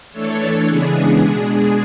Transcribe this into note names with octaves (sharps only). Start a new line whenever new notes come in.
E3 A3 D4 A4 C#5
C#3 E3 G#3 B3 D4 G#4
B2 G#3 D4